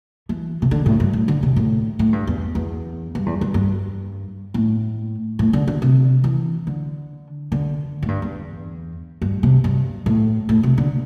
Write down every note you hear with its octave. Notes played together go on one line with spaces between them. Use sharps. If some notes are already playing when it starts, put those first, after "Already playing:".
E3
C3
D3
A2
G2
A2
D3
C3
A2
A2
G2
E2
E2
G2
E2
G2
G2
A2
A2
D3
D3
C3
E3
D3
D3
A2
G2
E2
G2
C3
G2
A2
A2
C3
D3